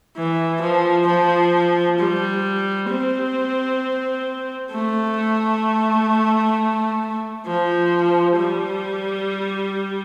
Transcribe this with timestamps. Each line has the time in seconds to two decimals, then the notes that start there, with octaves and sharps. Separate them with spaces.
0.16 E3
0.61 F3
1.06 F3
1.98 G3
2.90 C4
4.71 A3
7.46 F3
8.36 G3